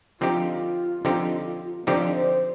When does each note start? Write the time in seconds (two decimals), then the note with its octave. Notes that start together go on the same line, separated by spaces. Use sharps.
0.20 D3 F3 C4 D#4 F4 G4
1.05 D3 F3 C4 D#4 G4
1.87 D3 F3 C4 D#4 G4 D5
2.15 C5